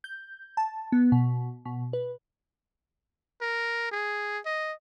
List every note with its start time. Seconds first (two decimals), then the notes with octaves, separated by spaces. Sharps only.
0.04 G6
0.57 A5
0.92 B3
1.12 B2
1.65 B2
1.93 B4
3.41 A#4
3.91 G#4
4.45 D#5